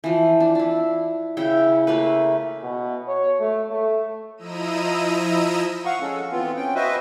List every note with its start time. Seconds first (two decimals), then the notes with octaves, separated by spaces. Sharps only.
0.04 E3 F3
0.40 D4
0.55 D4 E4
1.37 C#3 E4 G5
1.87 A3 A#3 B4
2.63 B2
3.07 C#5
3.40 A3
3.71 A3
4.37 F3 E4 D#5 A#5 E6 D#7
5.85 F5 F#5 C#6
6.01 G#3 C#4 A4
6.32 E3 B3 C4 F4
6.57 C4 C#4 G5
6.75 F#4 B4 C5 D#5 E5